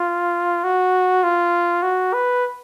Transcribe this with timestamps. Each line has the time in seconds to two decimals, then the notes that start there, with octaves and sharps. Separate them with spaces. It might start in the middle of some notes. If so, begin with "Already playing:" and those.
Already playing: F4
0.64 F#4
1.23 F4
1.82 F#4
2.13 B4